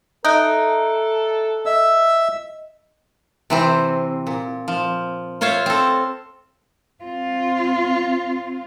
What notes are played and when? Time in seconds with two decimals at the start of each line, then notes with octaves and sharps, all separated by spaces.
0.25 D#4 A4 E5 F#6 D7
1.66 D#5 E5 E6
3.50 C3 E3 C4
4.27 A#2
4.68 F3
5.41 F4 C5 C#5 E5 F5
5.66 C4 A4
7.04 C4 F4